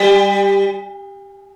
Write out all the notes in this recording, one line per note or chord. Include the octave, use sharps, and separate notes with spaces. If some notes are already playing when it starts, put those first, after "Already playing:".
Already playing: G3